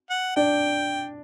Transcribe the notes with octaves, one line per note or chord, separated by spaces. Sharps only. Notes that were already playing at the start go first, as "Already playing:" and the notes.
F#5
D4 G5